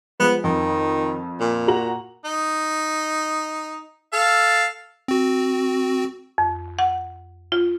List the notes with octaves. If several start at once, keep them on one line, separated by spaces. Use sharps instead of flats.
F3 G#3 B3
F2 D#3
A#2
F#4 A#5 F#7
D#4
A4 F5
C4 F#4
F2
F#5
F4